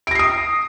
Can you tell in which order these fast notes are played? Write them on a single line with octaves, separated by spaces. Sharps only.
D7 A#6 C7 D#6